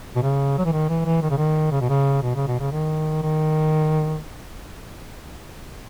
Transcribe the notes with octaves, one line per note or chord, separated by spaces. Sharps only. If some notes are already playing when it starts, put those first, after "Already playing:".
B2
C#3
F#3
E3
D#3
E3
E3
D#3
C#3
D#3
C#3
B2
C#3
B2
C#3
B2
C#3
D#3
D#3